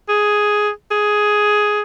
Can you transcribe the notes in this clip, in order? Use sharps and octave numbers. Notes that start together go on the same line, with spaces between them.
G#4
G#4